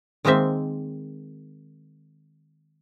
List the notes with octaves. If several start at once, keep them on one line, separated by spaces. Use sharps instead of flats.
D#3 G#3 A#3 C4 E5